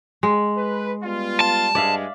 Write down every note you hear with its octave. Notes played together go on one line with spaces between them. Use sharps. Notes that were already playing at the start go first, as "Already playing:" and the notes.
G#3
B4
G3 B3 F4
A5
G2 G#3 D5 E5 F5